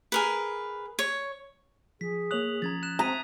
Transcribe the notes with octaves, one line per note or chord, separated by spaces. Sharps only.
G#4 A#4 B4
C#5
F3 G#4 B6
A#3 C#5 D#6 F#6 F7 F#7
F3 C#4 A#5 G#6 A6
F#6 E7
C4 A#5 D#6 B6 D#7